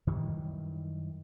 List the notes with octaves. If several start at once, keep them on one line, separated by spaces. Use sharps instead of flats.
F#2 D#3 E3 G3